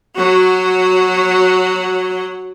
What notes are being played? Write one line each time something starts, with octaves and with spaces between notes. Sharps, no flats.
F#3 F#4